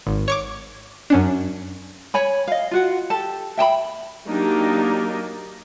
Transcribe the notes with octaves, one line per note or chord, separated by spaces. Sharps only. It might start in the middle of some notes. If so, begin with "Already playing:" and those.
G#1
C#5 C#6 D6
F#2 C#4 D4
C#5 G#5 B5
D#5 F5
F4 F#4 F#5
G4 A4 A5
E5 G5 A5 B5
F#3 A#3 D4 D#4 G4